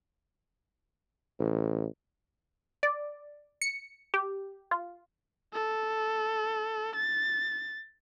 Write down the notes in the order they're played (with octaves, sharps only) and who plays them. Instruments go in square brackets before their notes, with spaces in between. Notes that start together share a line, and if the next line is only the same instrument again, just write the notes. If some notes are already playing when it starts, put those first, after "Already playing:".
[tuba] A1
[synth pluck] D5
C#7
G4
F4
[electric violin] A4
A6